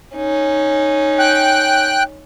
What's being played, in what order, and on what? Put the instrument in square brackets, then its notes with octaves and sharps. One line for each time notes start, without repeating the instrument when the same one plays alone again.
[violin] C#4 D#4
[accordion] G5 F#6